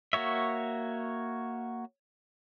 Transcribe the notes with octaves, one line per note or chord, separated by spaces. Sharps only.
A#3 F#4 C#5 E5